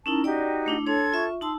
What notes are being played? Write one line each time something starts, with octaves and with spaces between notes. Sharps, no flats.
C#4 D#4 E4 A#4 A5
D#4 F#4 G4 D5 G5
A3 D4 E4
D4 A4 C#5 C6 G#6
F4 E5 C#6
D#4 A5 C6 E6